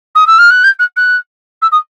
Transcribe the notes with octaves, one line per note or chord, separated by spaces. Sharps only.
D#6
E6
F6
F#6
G6
F#6
F#6
E6
D#6